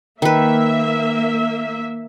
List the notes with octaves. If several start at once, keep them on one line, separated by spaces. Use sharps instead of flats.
D#3 A#3 B4 E5